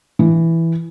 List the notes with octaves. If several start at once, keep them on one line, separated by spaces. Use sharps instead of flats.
E3